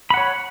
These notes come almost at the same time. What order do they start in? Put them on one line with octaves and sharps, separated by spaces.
B5 F#5 C#5